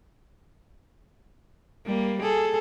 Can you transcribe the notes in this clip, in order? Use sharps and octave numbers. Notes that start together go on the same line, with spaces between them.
G3 A#3
G#4 A4